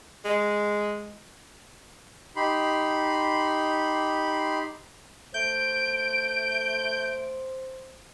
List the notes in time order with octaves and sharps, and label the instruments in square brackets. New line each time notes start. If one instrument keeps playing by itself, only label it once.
[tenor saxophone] G#3
[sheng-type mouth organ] D#4 G4 B5 C6
[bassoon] A3 [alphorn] C5 [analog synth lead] G6 [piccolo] D7